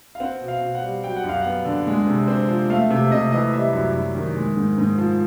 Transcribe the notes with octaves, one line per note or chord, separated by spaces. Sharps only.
F5
C4 F#5
B2
F5
B2
F#5
G3
F#3 G5
F#5
F#2 F5
B3 F#5
D3
G#3
C3
C4
F3
A3 F5
C3
C3 D#5
E3 D#5
G3 E5
F#2
F#2
D#3
G#3
G#2
G#2
F3